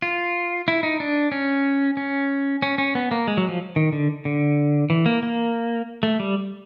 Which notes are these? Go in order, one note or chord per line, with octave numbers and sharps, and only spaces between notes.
F4
E4
D#4
D4
C#4
C#4
C#4
C#4
B3
A#3
G#3
F#3
F3
D#3
D3
D3
E3
A#3
A#3
A3
G3